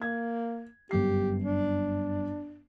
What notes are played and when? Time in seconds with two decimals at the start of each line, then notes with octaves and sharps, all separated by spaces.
0.02 A#3 G#6
0.91 G1 F#2 G4 C7
1.44 D4